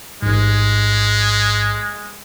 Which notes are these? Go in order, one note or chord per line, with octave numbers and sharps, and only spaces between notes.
A1 G#2 G#3